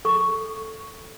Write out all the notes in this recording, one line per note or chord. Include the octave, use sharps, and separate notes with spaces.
A4 C#6